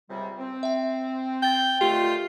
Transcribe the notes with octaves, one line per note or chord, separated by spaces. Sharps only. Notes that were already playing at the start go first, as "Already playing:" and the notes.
C#2 C3 G3
C4
E5 G5
G5 G6 A6
D3 D#3 A3 F4 G4